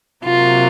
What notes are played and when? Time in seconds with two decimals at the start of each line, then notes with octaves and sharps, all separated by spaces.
0.24 C3 F#3 A#3 F4